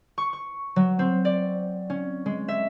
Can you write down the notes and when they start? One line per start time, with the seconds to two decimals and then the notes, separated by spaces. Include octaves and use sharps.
0.18 C#6
0.33 C#6
0.76 F#3
0.99 C4
1.25 D5
1.90 C#4
2.26 G#3
2.48 E5